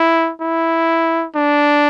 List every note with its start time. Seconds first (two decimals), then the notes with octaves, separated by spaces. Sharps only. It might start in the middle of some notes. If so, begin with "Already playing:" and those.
Already playing: E4
0.41 E4
1.35 D4